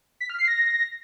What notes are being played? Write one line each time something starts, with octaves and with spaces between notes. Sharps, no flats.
B6
F6
C7
A#6